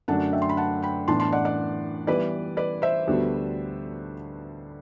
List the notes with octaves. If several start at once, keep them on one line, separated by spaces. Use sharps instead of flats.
F#2 D3 F#3 A3 D4 F#5 A5
E5 G5
C6
B5
F#5 A5
G5 B5
A2 E3 B3 D4 A5 C6
A5 C6
D5 F#5
D5 F#5
E3 G3 B3 E4 B4 D5
B4 D5
C5 E5
D2 D3 G3 B3 F#4